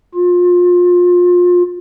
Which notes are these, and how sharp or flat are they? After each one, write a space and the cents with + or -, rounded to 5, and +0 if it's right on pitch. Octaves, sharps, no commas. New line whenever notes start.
F4 +30